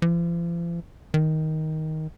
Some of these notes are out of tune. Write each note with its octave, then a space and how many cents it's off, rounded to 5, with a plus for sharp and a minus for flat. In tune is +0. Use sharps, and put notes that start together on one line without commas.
F3 -45
D#3 +10